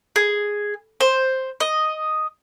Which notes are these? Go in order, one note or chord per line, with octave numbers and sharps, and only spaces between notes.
G#4
C5
D#5